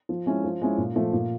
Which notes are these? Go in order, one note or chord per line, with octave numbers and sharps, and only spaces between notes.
F3
G#3 C#4 E4
F3
G#3 C#4 E4
A#2
F3 A3
A#2